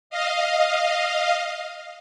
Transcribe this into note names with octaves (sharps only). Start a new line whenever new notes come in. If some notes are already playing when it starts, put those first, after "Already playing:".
D#5 F5